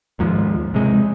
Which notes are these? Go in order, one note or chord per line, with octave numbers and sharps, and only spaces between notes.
D#2 G#2 F3
C3 G#3